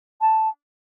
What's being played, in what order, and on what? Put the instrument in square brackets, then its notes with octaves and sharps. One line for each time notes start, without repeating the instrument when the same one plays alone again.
[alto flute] A5